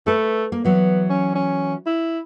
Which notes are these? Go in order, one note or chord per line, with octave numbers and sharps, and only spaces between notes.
A3 A4 B4
A#3
E3 F#3 B3
C#4
C#4
E4